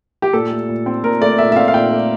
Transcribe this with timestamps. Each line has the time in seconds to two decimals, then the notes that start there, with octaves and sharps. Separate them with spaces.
0.22 G4
0.33 A#2 A4
0.51 A3
0.69 A#2
0.86 C4
1.04 A#2 A#4
1.21 A3 D5
1.38 A#2 E5
1.52 E5
1.56 C4 F5
1.68 F5
1.74 A#2 G5
1.91 A3